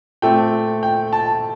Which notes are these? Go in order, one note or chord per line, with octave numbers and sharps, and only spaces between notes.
A#2 A3 C4 G5
G5
A5